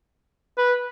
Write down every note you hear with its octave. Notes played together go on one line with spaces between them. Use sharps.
B4